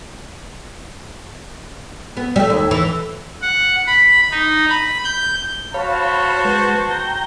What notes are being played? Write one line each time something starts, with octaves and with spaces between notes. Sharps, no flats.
B3
G3 A3
D#2
E3
F#5
B5
D#4
B5
G6
F#4 C5 C#5 F5 A5 B5
G#3 B4
G5 A#5 G6